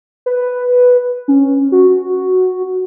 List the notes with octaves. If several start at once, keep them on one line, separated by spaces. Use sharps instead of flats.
B4
C#4
F#4